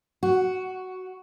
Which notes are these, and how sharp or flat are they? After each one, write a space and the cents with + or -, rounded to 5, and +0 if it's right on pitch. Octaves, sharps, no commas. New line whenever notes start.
F#4 +5